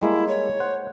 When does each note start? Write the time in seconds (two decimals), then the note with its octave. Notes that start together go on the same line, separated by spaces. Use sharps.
0.02 G3 G#3 A#3 E4
0.28 C#5
0.60 C5 F#5